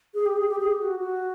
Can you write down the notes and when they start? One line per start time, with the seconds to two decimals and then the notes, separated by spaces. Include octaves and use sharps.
0.14 G#4
0.26 G4
0.37 G#4
0.48 G4
0.59 G#4
0.71 G4
0.82 F#4
1.00 F#4